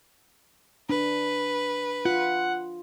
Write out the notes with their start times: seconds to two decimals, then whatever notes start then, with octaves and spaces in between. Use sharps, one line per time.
0.89 D4 B4
2.05 F4 F#5